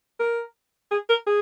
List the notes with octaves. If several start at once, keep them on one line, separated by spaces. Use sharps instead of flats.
A#4
G#4
A#4
G#4